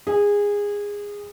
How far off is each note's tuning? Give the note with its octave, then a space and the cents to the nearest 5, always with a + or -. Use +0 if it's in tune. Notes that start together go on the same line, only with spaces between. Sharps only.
G#4 -20